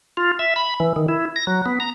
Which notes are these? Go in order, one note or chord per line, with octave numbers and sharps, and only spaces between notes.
F4
E5
B5
E3
D#3
E4
A#6
F#3
B3
A#5